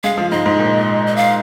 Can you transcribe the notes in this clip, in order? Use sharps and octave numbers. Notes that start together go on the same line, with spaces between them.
G#3 F5
F3
G#2 D#5
G#2
A#2
D#5
F5